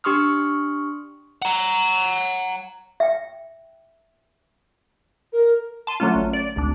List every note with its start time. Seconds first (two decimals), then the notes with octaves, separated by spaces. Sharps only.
0.04 D4 G4 C6 C#6 D#6 F6
1.42 F#5 A#5
3.00 E5 G5
5.33 A#4
5.87 A5 C6 D#7
6.00 D3 F#3 A3 C#4 F4
6.15 A1
6.33 D5
6.56 G#1 D2 D4